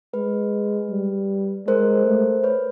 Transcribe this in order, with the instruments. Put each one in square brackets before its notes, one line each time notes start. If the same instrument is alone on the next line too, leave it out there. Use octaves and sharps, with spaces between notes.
[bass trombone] G#3 [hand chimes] B4
[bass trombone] G3
[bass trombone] G#3 [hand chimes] A#4 C5
[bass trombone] A3
[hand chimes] B4 C#5